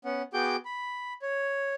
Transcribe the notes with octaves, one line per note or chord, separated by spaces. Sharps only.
B3 C#4 F#5
B3 F#4 G#4 G5 D6 G6
B5
C#5